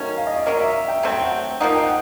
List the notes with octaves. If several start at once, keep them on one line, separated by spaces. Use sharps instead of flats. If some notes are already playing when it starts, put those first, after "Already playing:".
Already playing: D#3 F#3 A3 C#4
F5
D#5
D5
F#3 A#3 C#4 D#5
E5
E5
G5
F#3 A3 C4
G5
F#5
F3 A#3 D#4 F#5
G5
F#5